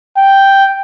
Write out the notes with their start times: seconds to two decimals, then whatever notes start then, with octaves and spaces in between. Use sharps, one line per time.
0.17 G5